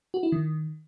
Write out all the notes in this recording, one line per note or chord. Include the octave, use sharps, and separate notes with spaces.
F#4
E4
D#3